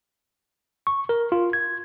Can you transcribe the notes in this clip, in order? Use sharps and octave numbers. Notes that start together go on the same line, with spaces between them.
C#6
A#4
F4
G#6